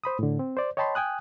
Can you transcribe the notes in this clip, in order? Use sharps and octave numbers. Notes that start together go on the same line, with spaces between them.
C5 B5 D#6
A2 D3
C4
C5 D5
C#5 D#5 G5 A5 B5 C6
G5 G#5 D#6 F#6